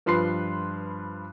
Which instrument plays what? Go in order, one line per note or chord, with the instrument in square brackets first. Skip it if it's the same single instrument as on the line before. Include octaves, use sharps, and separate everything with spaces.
[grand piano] G2 F3 B4 C6 C7